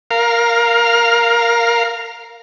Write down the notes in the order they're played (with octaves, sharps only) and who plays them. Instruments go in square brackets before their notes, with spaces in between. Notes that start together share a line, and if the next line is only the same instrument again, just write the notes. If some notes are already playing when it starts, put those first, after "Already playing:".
[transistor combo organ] A#4 F5